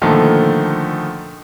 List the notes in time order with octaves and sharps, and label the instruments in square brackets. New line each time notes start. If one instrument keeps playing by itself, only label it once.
[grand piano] A#2 D3 D#3 F3 A3